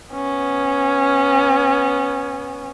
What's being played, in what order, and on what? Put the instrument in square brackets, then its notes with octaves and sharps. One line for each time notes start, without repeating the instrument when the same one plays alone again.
[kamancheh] B3 C#4